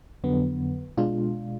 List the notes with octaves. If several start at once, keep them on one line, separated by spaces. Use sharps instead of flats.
F2 D3 F#3 B3
B2 G#3 D4 F4